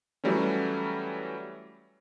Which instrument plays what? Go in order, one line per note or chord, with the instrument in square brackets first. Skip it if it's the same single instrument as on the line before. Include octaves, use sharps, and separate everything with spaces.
[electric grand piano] E3 F#3 G3 A3 C#4